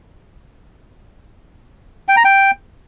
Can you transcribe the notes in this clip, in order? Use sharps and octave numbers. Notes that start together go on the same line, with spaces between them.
G5
A#5
G5